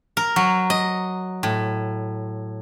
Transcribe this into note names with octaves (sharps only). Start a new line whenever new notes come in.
A#4
F#3
D#5
A2